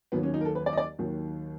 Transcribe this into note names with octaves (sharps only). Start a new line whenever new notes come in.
D#2 D#3 F#3 B3
C#4
D#4
A#4
A4
B4
D5
D#5
D5
D#2 D#3 F#3